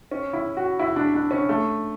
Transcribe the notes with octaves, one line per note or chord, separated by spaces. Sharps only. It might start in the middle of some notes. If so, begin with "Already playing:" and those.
C#4
E4
F#4
E4
D4
D4
C#4
A3